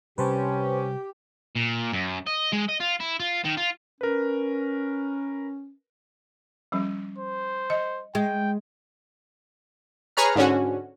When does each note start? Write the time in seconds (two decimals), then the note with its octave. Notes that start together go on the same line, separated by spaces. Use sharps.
0.18 C3 G3 C#4 G4 B4 C5 A5
1.56 A#2
1.92 F#2
2.27 D#5
2.53 G#3
2.69 D#5
2.80 F4
3.00 E4
3.20 F4
3.44 D#3
3.57 F4
4.01 C#4 A#4 B4
6.72 F3 G3 C#4
7.18 C5
7.70 D#5
8.15 G#3 G5
10.17 G#4 B4 C#5 A#5 F6
10.36 G#2 D3 C#4 F#4